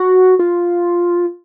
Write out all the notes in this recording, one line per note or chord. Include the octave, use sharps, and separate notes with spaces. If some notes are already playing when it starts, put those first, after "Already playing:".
Already playing: F#4
F4